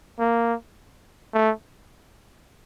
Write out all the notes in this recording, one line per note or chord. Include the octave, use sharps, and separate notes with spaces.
A#3
A3